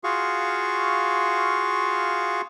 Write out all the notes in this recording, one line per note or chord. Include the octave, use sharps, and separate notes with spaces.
F4 F#4 G#4 F5 C#6